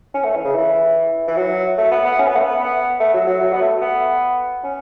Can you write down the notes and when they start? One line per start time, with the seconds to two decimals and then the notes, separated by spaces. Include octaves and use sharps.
0.14 C#4
0.25 A3
0.35 E3
0.45 C#3
0.55 E3
1.28 E3
1.36 F#3
1.78 A3
1.91 B3
2.05 B3
2.19 C#4
2.28 B3
2.36 A3
2.44 B3
2.60 B3
3.00 A3
3.14 F#3
3.27 F#3
3.41 F#3
3.53 B3
3.61 A3
3.81 B3
4.64 C#4